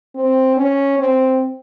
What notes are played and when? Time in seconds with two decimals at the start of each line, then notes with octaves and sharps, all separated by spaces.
0.15 C4
0.57 C#4
0.98 C4